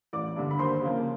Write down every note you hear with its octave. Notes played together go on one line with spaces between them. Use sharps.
A1 D5 D6
G2 D3
B5
D#2 C5 C6
C#3 F3 A#3